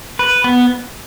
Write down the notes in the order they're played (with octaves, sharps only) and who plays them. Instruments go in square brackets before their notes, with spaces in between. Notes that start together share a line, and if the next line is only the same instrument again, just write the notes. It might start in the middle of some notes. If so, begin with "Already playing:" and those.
[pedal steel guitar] B4
B3